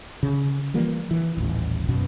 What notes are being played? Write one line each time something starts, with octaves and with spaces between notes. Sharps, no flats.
C#3
E3 F3 G3 A#3
E3
D#1 A1 E2
F#2 B2 B3